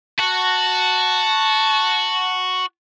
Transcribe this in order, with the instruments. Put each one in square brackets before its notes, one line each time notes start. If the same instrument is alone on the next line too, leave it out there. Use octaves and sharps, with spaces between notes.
[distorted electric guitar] F#4 [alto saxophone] A5